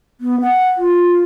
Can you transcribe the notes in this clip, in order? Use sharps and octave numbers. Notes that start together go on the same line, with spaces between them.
B3
F#5
F4